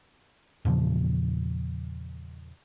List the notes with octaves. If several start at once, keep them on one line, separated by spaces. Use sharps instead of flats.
E2 A#2 C#3 F3